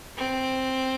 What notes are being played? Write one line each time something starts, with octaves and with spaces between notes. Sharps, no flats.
C4